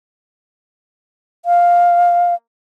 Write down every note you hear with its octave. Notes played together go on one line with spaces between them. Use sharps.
F5